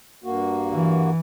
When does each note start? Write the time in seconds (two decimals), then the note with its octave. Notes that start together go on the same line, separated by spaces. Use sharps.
0.24 G2 A#3 F#4
0.72 E3